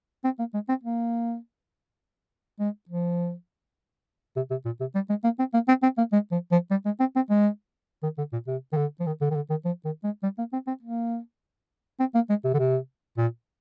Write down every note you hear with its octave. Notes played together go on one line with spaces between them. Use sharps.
C4
A#3
G#3
C4
A#3
G#3
F3
C3
C3
A#2
C3
G3
G#3
A#3
C4
A#3
C4
C4
A#3
G#3
F3
F3
G3
G#3
C4
C4
G#3
D#3
D3
A#2
C3
D#3
D3
F3
D#3
D3
D#3
D3
D#3
F3
D#3
G#3
G3
A#3
C4
C4
A#3
C4
A#3
G#3
C3
D3
C3
A#2